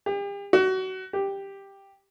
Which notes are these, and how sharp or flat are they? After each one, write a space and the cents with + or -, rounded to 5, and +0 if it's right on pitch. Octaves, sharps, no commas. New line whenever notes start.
G4 +40
F#4 +25
G4 +5